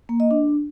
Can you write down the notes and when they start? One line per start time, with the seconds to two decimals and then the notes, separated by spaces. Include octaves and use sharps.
0.09 A#3
0.20 D#5
0.31 D4